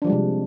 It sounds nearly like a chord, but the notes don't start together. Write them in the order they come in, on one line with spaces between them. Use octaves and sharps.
D4 F3 G3 G#3 C3